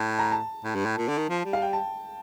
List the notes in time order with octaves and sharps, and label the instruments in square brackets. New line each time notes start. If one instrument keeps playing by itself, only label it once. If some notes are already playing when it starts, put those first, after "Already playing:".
Already playing: [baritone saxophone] A2 [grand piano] A5
[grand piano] A#5
A5
[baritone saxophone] A2
G2
A2
A#2
D3
D#3
F3
G3
[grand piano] F5
G5
A5